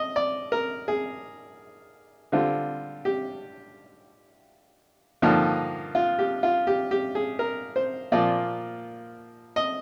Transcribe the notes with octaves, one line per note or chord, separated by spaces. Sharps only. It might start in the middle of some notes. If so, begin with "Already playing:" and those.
Already playing: D#5
D5
A#4
G#4
D3 G3 C4 F4
G4
G2 D3 F3 A#3 D#4
F4
G4
F4
G4
G4
G#4
A#4
C5
A#2 F3 A#3 F4 D5
D#5